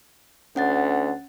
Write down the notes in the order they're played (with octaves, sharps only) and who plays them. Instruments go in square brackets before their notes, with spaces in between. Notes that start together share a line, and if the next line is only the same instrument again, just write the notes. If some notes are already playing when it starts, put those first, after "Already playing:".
[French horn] D2 [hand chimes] C#4 F#5 A6